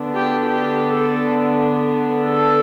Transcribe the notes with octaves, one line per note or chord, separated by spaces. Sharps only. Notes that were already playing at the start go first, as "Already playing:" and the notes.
Already playing: D3 B3 D4
G4
G4
A4
A4